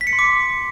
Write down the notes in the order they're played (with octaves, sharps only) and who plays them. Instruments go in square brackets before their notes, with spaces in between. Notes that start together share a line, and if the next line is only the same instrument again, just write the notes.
[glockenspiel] B6
C#7
C6
D6